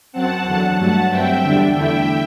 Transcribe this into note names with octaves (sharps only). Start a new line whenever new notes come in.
F#2 F#3 C4 F#5 A5
E2 D3 F#3
G2 F#3 A3 F#5 A5
G2 F#3 C4 E5 G5
E2 D3 G3 D4
E2 D3 A3 E4 E5 G5